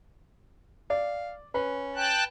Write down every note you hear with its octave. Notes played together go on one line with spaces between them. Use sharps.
D5 F5
C#4 B4
G5 A5 F#6